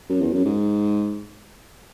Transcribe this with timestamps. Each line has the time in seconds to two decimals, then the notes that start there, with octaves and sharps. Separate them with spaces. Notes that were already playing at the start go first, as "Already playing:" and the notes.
0.10 F#2
0.21 E2
0.33 F#2
0.45 G#2